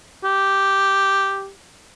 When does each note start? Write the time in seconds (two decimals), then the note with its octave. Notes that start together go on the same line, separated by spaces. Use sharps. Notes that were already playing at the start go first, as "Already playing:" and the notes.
0.24 G4